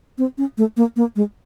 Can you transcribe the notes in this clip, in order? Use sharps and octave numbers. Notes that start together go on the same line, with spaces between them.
C4
C#4
A3
A#3
A#3
G#3